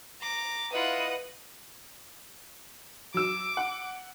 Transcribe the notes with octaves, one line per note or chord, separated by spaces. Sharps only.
A#5 D6
E4 F4 B4 D#5 F#5 D#6
F#3 D6 E6
F#5